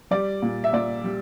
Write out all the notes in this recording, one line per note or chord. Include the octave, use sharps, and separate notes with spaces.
G3 D5
A#2
E5
A#2 D5
G3